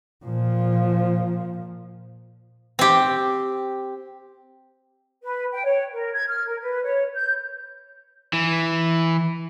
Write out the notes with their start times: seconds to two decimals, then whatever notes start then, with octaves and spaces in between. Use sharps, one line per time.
0.25 A#2 F3
2.79 C4 G4
5.23 B4
5.52 G5
5.64 C#5
5.92 A#4
6.14 G#6
6.29 F6
6.46 A#4
6.62 B4
6.82 C#5
7.15 G6
8.33 E3